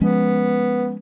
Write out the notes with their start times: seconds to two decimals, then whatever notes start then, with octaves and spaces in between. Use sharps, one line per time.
0.01 F3 G#3 B3 C#4